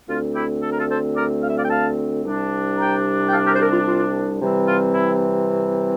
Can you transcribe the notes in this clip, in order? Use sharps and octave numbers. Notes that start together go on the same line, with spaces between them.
D2 D3 A3 C4 F4
E4 G4
A4
A#4
F4 A4
A4 C5
A#4 D5
F5
E5
D5 F5
G5
F5 A5
C2 C3 G3 D4
G5 A#5
G5
F5 A5
G4 A#4
C5
G4 A#4
F4
F4
C3 E3 G3 C4
F4
E4